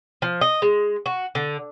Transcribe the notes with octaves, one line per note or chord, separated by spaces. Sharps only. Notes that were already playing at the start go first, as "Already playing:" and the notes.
F3
D#5
G#3
F#4
D3